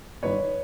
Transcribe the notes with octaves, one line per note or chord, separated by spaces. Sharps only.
G1 G2 D#3 B4 C#5